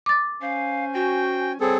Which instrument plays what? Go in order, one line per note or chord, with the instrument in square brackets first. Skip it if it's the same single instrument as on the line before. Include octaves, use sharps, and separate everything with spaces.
[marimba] D6 A6
[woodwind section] C#4 C5 G#5 [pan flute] F5
[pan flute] F#4 [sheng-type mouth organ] G5
[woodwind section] G3 C#5 [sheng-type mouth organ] C4 G#4 A4